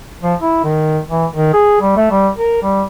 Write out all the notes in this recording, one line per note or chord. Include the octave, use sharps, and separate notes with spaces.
F3
E4
D#3
E3
D#3
G#4
G3
A3
G3
A#4
G3